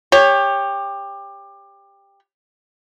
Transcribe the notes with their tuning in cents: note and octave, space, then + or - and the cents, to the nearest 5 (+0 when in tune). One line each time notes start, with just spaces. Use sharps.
G4 +20 C#5 +0